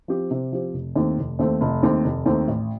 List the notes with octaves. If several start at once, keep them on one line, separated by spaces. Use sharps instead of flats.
F3 C4 G4
C3
F3 C4 G4
F1
D#2 D#3 A3 C4
F1
D#2 D#3 A3 C4
F1
D#2 D#3 A3 C4
F1
D#2 D#3 A3 C4
A1